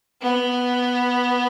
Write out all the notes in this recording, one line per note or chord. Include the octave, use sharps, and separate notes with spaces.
B3